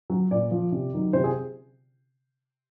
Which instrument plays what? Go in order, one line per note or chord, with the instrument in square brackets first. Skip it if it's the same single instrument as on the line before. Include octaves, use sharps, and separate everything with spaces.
[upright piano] F#3
A#2 D5
F3
C3
D#3 F#3
C3 C5
G#4